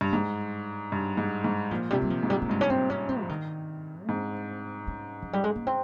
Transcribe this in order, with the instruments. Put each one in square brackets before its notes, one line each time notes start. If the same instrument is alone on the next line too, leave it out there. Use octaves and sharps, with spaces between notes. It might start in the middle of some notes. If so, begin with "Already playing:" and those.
[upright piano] G2
[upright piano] G#2 [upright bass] G3
[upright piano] G2
G#2
G#2
[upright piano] A#2 [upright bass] F3
[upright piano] C3 [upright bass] G3
[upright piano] A#2
[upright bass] G3
F3
[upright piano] G#2
[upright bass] G3
A#3
[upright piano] G2 [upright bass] G#3
[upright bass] C#4
C4
C#4
C4
F3
D#3
[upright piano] G#2 [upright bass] C4
[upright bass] C#4
F3
G3
G#3
A#3
C4